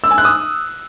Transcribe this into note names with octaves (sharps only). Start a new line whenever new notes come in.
E6
G#5
F#6
D#6